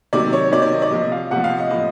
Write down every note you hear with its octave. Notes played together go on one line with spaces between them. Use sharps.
C3 D#3 F#3 D5
C#5
C3 D#3 F#3 D5
D5
D#5
D5
C3 F3 D#5
F5
C3 F3 F#5
F5
D#5
A2 F3 D#5